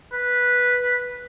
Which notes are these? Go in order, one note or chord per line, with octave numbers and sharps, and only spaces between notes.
B4